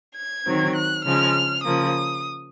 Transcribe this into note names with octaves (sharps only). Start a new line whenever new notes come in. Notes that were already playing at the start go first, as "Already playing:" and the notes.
G#6
D#3 F#3 C4
F#6
C#3 F3 G#3 F6
C#3 F3 A#3 D#6